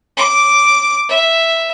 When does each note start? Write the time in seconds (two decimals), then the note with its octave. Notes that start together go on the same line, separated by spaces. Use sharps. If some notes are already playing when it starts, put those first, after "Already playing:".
0.17 D6
1.09 E5